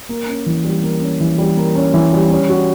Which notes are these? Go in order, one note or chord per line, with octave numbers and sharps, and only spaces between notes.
A#3
C#4
E3
G3
A#3
C#4
E3
G3
A#3
C#4
E3
G3
C#4
F#4